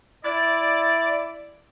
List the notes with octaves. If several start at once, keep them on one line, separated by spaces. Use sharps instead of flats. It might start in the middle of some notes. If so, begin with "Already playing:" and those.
E4 D5